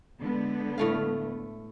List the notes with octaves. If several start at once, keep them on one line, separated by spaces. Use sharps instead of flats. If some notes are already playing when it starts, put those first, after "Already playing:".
D3 G#3 B3
A2 A3 F5